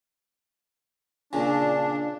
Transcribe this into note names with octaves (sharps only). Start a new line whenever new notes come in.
A#2 C#3 D4